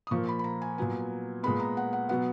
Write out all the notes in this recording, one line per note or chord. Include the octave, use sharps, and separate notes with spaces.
D#6
A#2 F3 A#3 C#6
B5
B5
A#5
G#5
A#2 F#3 B3 G#5
A#2 G#3 B3 B5
A#5
F#5
F#5
B2 F#3 B3 F#5